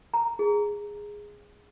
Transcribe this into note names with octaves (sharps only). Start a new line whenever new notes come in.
A#5
G#4